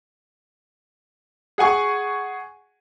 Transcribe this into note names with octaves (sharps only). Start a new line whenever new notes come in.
G#4 F#5 G#5 C#6